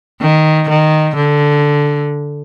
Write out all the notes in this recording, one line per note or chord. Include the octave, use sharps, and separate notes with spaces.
D#3
D#3
D3